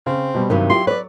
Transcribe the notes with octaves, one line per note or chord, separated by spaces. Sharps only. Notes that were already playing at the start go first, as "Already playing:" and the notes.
C#3 C4
B2 G3
G2 C3 D#3 F#3
E4 F4 G4 C6
B4 C#5 D5